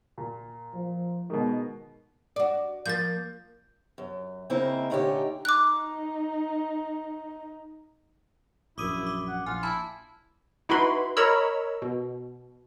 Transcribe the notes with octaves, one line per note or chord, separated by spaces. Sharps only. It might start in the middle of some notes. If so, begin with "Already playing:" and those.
A#2
F3
B2 D#3 G#3
F#4 D5
F3 A#3 G6 A6
F#2
C#3 A#3 C4 D#4 E4
A#2 D3 A3 C#4 D#4 G4
D#4 D6 F#6
A#1 F#2 E4 D6 D#6 D#7
D6
F#5
A#1 F4 G#5
E4 A5 B5
D#4 E4 F#4 B4 B5 C6
A#4 C#5 D#5 A#5 B5 E6
B2